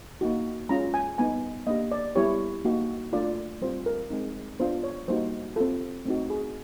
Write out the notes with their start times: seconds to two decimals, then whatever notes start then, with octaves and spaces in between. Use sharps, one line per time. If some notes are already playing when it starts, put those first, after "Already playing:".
0.21 A#3 D#4 F#4
0.69 G#3 C#4 F4 A#5
0.94 G#5
1.18 G3 B3 D#4 G#5
1.67 A#3 D4 G4 D#5
1.92 D5
2.15 G3 B3 E4 G4 C#5
2.65 A#3 D#4 F#4
3.13 A3 D4 F4 D5
3.61 G3 C4 F4 C5
3.86 A#4
4.10 G#3 C4 D#4
4.60 B3 D4 F4 C5
4.83 C#5
5.08 G3 A#3 D#4 F#4 C5
5.56 C4 F4 A4
6.05 A3 C4 D#4 F#4
6.30 G#4